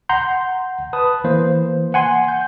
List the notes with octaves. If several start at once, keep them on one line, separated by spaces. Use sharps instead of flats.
F#5 A#5 C6 G6
B4 A5 D#6
E3 A#3 C5
F#5 G#5 C6
G6